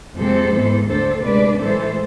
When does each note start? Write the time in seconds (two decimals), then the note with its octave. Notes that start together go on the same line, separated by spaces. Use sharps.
0.17 F2 C3 G#3 C4 A4 C5
0.53 G#2 E3 B3
0.88 D2 D3 A3 A4 C5
1.24 C3 G#3 D4 B4 D5
1.60 A2 E3 G#3 A4 C5